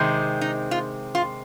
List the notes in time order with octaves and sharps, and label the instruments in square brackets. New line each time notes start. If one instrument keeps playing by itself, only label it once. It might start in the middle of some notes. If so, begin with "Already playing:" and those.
Already playing: [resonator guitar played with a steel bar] C3 D#3 G#3 C4
D#4
F4
F4